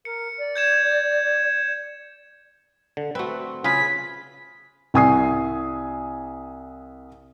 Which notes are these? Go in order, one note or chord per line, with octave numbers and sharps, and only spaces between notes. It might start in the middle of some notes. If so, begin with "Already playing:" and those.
A#4 C#7
D5
G6 G#6 E7
D3
A3 C4 F#4 B4
C#3 F4 G#4 B4 G#5 B6
C2 G#5 D#6 C7